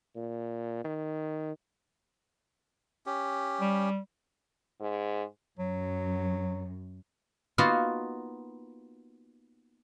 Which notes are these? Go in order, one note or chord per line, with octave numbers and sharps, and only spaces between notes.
A#2
D#3
C#4 G4
G3
G#2
F#2 F#3
A#3 B3 D#4 F4 F#4